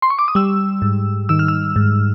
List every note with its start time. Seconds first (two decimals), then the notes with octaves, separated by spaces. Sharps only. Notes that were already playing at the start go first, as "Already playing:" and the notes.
0.02 C6
0.10 C#6
0.19 D6
0.28 D#6
0.35 G3 E6
0.82 G#2
1.29 D#3 E6
1.39 F6
1.48 E6
1.76 G#2